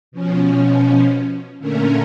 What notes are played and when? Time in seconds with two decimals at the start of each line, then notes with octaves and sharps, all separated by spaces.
0.12 B2 F3 C#4
1.59 A#2 D3 A3 C#4 A#4